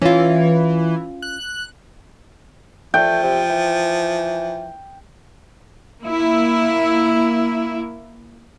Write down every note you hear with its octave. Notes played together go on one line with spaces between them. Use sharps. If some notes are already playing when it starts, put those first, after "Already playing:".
E3 C#4 F4
F#6
F3 A3 G5
C3
E3
A#3 E4